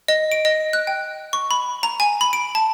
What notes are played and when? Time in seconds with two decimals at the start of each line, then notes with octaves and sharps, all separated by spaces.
0.08 D#5
0.32 D7
0.45 D#5
0.73 F#6
0.87 G5
1.33 C#6
1.51 B5
1.83 A#5
2.00 G#5
2.21 B5
2.33 D7
2.55 A5